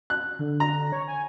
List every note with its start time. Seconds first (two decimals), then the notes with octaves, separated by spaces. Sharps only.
0.10 F#6
0.39 D3
0.60 A#5
0.92 C#5
1.08 G#5